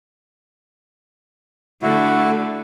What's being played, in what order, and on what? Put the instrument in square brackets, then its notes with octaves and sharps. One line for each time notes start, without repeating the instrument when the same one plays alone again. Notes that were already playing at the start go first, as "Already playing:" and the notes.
[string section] D3 A3 [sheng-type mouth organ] E4 F#4